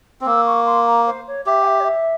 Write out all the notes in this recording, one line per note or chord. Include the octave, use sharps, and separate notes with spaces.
C4
A#3 E6
C#6
C6
A#5
C5
C#5
G4 E5
G#5
E5
C#5
E5